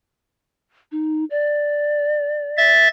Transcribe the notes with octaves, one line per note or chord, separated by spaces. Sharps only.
D#4
D5
E5 A6